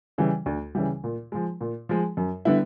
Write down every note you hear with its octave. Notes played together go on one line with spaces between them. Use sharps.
C#3 E3 G3
D2
C#3 E3 G3
A#2
F3 G#3
A#2
F3 G#3
F#2
D3 G3 B3 E4